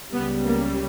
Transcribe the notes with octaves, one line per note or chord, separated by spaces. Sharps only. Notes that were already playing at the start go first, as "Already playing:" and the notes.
C#2 C#3 G3 B3
A#3